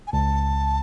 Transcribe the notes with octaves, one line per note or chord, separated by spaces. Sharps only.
G#5
C#2 A5